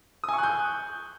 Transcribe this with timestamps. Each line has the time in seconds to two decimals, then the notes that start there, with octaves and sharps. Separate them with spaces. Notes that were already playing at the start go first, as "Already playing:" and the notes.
0.24 D#6
0.29 G#5
0.33 C#6
0.38 F#6
0.43 G6